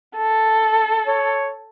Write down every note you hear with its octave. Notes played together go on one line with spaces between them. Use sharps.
A4
C#5